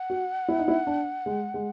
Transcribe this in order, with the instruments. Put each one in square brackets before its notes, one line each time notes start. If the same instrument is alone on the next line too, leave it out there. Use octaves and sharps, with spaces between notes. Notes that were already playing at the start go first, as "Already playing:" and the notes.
Already playing: [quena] F#5
[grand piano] F#4
E4
D#4
E4
D4
G#3
G#3